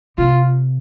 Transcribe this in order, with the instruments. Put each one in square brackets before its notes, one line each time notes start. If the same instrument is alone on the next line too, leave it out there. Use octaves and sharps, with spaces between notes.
[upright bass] C3 [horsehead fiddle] F4